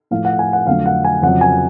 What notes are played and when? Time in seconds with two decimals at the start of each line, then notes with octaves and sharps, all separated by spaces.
0.11 A2 F3 A3 F5
0.25 F#5
0.39 G#5
0.53 F#5
0.67 F2 D3 F#3 A3 F5
0.86 F#5
1.04 G#5
1.22 F2 C#3 F#3 F#5
1.41 G#5